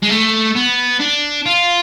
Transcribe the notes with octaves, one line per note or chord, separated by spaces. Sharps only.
G#3
A3
B3
D4
F4